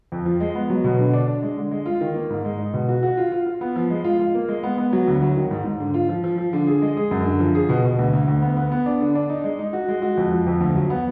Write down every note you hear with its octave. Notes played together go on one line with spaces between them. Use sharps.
F2
F3
G#3
B3
F#3
B2
D3
D4
D4
G#3
D3
G#3
F4
D#3
A#3
G#2
G#3
D#4
B2
F#4
F#4
F4
F4
F4
B3
F3
G#3
F4
F4
A#3
G#3
B3
B3
F#3
D2
F#3
D#3
G#2
G#2
D3
F4
F3
F3
F3
D3
G#4
G#3
G#4
F#2
D3
F3
G#4
B2
B2
D2
D2
D2
B3
B3
B3
D4
D3
D4
D#4
G#3
D#4
F#4
G#3
F#4
F2
F3
F2
D2
F#3
B3